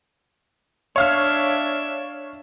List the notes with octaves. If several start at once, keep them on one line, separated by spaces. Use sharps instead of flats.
D4 C#5 E5 F5 F6